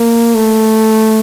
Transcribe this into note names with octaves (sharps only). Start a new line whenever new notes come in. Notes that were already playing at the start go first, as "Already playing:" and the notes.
Already playing: A#3
A3